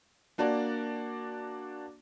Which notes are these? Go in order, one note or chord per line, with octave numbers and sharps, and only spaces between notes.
A#3 D4 F#4 D5